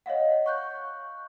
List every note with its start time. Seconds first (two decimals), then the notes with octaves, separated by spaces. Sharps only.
0.06 C#5 D#5 F5 F#5
0.46 C#6 F#6 G6